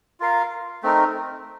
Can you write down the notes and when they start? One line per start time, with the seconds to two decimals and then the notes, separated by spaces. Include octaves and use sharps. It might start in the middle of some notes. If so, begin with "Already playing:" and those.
0.20 F4 A#4 F5
0.83 A3 C4 D#4 A#4